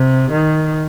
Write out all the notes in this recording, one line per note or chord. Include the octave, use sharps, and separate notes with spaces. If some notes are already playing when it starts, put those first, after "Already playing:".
Already playing: C3
D#3